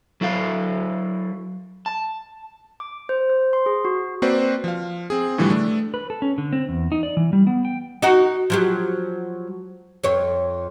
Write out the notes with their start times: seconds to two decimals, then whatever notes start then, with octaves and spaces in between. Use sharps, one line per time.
0.21 F#3 E4 A4 F5
1.86 A5
2.80 D6
3.09 C5
3.30 C5
3.53 C6
3.66 G#4
3.85 F#4
4.22 A#3 C4 F#4 B4 C5 D5
4.64 F3 F5
5.10 C4 G#4
5.38 A2 D3 E3 F3 G3
5.50 A3 D4
5.94 B4
6.10 A4
6.22 C#4
6.38 D3
6.53 C4
6.69 E2
6.92 D#4
7.03 D5
7.17 E3
7.33 G3
7.47 B3
7.65 G5
8.02 D#4 F#4 A#4
8.50 F3 F#3 G4
10.04 F2 C#5